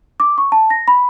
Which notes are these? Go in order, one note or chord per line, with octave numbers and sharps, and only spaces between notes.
D6
C#6
A5
A#6
B5